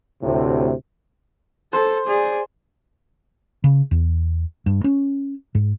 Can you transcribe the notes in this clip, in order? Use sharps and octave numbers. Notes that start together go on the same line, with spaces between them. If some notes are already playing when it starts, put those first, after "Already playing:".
D2 A2 C3
A4 C5
G#4 D5
C#3
E2
G2
C#4
G#2